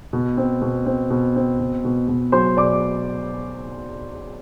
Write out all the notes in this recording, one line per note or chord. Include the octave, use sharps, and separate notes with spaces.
B2
C4
B2
C4
B2
C4
B2
B2
B2
F#3 C5 C6
B2 D5 D6